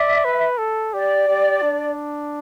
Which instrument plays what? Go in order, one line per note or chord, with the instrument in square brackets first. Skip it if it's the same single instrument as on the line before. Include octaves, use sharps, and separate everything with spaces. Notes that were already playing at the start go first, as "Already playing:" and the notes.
Already playing: [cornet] D5 [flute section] E5
[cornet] B4
A4
[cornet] G4 [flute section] D5
[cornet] G4
D4